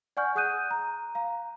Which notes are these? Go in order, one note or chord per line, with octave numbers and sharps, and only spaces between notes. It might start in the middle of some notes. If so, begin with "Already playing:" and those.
D5 F#5 G#5 C#6 F6 G6
G#4 F#5 D#6 F#6 G6 D#7
A#5
F5 A#5